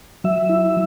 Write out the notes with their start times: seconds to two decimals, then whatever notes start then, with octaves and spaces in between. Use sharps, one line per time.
0.24 F#3 E5
0.49 E4